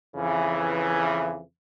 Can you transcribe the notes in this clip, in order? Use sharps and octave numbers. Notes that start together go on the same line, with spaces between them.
F2 C#3 E3